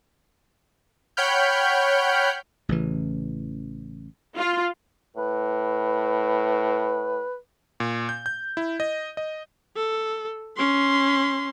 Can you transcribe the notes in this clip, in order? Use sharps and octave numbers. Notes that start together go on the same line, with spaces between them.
C#5 F#5 G5 B5 F6 G6
A1 C#3 E3
F4
A2 B4
A#2
G6
G6
E4
D#5
D#5
A4
C#4 C6